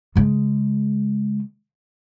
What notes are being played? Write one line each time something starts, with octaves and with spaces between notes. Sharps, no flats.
C#3 G#3